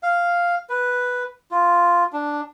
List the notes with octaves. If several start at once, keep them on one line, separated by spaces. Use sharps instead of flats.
F5
B4
F4
D4